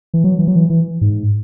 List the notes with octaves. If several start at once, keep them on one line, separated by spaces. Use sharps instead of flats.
E3
F#3
E3
F#3
E3
E3
G#2